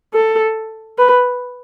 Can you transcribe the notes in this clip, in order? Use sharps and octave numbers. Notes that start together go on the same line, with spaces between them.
A4
B4